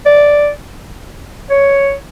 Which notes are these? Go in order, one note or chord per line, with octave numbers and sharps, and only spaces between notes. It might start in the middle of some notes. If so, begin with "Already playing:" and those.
D5
C#5